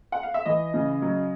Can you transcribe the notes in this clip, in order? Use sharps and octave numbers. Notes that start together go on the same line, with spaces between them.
F#5
F5
E5
E3 D#5
C#3
F#3